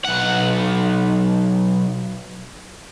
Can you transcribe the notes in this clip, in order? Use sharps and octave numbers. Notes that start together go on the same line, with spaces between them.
B1 F#5